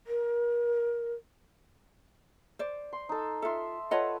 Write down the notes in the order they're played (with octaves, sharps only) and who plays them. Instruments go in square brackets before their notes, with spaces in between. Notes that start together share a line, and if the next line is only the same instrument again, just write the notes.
[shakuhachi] A#4
[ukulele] C5 D5
[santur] C6
D#4 A4
[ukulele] F4 A4 [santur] E5 C6
[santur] F4 A4 B4 [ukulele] C#5 D#5 F#5